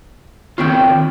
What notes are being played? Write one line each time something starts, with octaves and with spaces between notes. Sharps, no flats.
D#3 C4 F4 C#5 G5